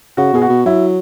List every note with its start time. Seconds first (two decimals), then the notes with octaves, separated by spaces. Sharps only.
0.17 C#3 F#4
0.33 B2 G#4
0.42 F#4
0.49 B2
0.66 F#3 E4